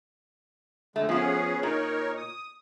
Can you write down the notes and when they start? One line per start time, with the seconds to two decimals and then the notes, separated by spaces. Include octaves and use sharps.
0.96 F2 D3 G#3 A3
1.09 F3 B3 C#4 F4 G#4
1.63 A#2 D#4 A#4 C#5
2.17 D#6